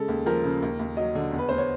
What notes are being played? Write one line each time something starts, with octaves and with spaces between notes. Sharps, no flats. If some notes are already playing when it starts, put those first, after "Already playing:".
Already playing: C#3 G#3 A4
D#2
F3 A#4
C#3
D#2
D#2
F#3 D#5
D3
E2
B4
E2 C5
C#5